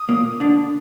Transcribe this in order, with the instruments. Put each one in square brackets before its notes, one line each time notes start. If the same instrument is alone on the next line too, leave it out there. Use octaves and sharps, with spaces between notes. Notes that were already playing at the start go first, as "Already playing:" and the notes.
Already playing: [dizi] D#6
[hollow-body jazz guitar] A#2 A#3
D3 D4